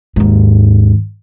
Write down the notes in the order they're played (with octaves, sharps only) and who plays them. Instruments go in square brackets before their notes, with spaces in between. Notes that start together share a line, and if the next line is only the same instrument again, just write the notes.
[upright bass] D#2 G#2